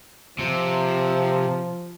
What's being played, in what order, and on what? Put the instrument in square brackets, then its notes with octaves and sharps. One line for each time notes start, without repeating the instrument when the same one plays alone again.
[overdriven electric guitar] C3 [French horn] F3